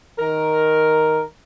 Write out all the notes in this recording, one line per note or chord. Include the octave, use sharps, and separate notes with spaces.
D#3 A#4